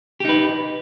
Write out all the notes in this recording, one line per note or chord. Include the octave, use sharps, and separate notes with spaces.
D#4 G4 B4